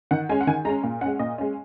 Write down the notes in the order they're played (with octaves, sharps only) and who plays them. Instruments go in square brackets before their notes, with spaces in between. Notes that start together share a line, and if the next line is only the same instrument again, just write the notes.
[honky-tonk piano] D#3 F#5
G#3 C#4 G#5
F#5
D#3 G#5
G#3 A#5
C#4
A#2
G#3 C#4 F#5
A#2 D#5
G#3 C#4